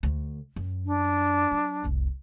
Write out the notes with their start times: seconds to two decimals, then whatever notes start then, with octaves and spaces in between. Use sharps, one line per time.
0.03 D2
0.56 F#2
0.86 D4
1.51 F#3
1.84 F1 C2